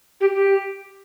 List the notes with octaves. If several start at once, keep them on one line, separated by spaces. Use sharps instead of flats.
G4
G4